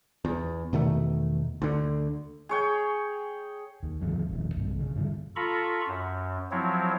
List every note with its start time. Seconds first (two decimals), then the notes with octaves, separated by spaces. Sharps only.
0.25 E2
0.73 E2 B2 D#3 A3
1.62 D2 D3
2.49 G#4 C#5 G5
3.83 D#2
4.01 G2 D3 D#3 F3
4.29 E1 A#1 D#3 F3
4.55 B1 G2 B2
4.80 C#3
4.96 G2 D3 F3
5.36 F4 A4 A#5 B5 C#6
5.88 F#2
6.51 F3 F#3 C4 E4 C#5